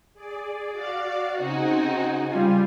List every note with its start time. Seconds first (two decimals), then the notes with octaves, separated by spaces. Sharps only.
0.14 G#4 D5
0.72 F#4 D5 F5
1.38 C#3 C4 D#4 F#4 G#5
2.31 G3 F4